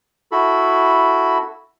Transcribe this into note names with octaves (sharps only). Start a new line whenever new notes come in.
E4 F#4 A4 B5